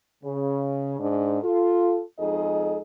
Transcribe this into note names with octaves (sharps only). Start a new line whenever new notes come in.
C#3
G#2 D4
F4 A4
F2 G#3 D#4 G#4 A4 D#5